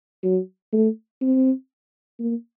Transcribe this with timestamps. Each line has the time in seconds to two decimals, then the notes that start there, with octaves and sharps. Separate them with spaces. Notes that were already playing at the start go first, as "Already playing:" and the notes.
0.23 F#3
0.72 A3
1.22 C4
2.19 A#3